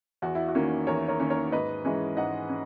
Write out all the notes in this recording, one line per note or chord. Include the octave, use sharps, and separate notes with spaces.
E2 F#4
E4
F#4
D#3 A#3 C#4
E2 A#4 C#5
A#4 C#5
D#3 A#3 C#4
A#4 C#5
G#2 B4 D#5
E3 G#3 C#4
G#2 D#5 F#5
C#4